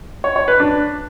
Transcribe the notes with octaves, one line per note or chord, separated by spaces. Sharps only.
C#5
C#5
B4
D4